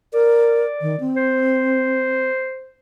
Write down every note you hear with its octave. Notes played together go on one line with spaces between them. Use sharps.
A#4 D5
D#3
C4
C5